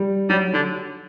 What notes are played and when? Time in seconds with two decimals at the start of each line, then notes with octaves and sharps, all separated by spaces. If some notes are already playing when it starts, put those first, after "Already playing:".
Already playing: G3
0.29 F#3 G3
0.53 D3 F#3